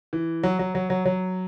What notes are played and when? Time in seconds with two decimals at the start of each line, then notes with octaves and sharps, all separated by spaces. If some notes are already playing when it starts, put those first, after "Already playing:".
0.13 E3
0.43 F#3
0.59 F#3
0.75 F#3
0.90 F#3
1.05 F#3